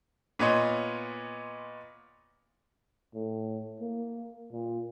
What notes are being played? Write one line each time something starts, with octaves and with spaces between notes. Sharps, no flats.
A#2 B3 C#5 D#5 C6
A2
A#3
A#2